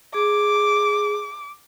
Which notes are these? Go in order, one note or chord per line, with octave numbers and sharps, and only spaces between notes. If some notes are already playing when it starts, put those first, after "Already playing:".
G#4 D6